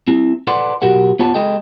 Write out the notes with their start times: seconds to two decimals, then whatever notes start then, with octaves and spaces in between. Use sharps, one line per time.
0.08 C4 E4
0.47 A4 B4 D5 F#5 C6
0.82 B1 F#4 G4 A#4 F#5
1.19 B3 F4 C#5 F#5 A5
1.34 G#3 A4 D#5 G5